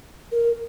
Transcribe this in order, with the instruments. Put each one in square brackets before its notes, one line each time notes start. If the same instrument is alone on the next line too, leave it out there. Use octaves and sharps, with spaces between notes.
[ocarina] A#4